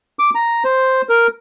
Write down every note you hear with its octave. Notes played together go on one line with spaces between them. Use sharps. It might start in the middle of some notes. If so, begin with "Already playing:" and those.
D6
A#5
C5
A#4